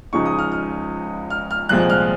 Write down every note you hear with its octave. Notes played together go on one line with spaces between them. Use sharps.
C#2 C#3 F3 G#3 D#4 C#6
D#6
F6
F6
F6
F6
C2 A#2 F3 G#3 C4 F#6
F6